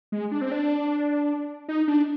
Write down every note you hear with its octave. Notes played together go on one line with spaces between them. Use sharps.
G#3
D4
C4
D4
D#4
D4